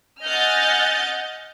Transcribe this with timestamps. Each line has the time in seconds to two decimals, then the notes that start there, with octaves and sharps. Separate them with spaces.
0.22 D#5 F#5 G#5 F6 G6 A6